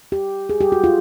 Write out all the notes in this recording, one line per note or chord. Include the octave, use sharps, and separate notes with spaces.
G4
G#4
G4
F#4
F4